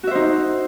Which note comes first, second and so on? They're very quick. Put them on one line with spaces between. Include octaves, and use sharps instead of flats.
F#4 E5 C5 D#4